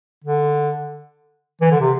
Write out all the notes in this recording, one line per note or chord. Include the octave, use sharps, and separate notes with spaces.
D3
E3
D3
C3